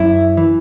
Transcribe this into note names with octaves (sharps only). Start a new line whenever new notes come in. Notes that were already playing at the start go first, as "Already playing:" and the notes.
Already playing: F#2 E4
E3